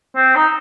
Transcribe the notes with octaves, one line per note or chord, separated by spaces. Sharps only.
C4
D#4